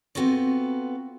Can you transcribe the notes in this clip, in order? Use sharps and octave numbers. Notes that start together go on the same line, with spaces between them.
B3 C4 F4 F#4 A4